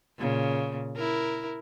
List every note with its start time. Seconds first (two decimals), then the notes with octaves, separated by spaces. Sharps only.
0.18 A#2 C#3
0.96 E4 A#4